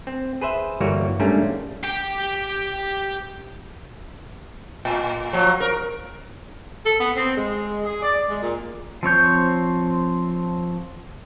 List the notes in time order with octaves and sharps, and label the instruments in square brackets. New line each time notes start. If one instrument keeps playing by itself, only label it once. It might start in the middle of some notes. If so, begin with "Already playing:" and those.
[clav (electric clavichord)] C4
G#4 B4 C5 E5
G1 E3 G3 A#3 F#4 C#5
G#2 G3 A3 A#3 C#4 D4
[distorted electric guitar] G4 G5
[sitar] A2
F3 F#3
A#4
[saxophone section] A4
B3
C4
G#3
G#4
D5
G#3
A#2
[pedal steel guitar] F3 C4 C#5 G6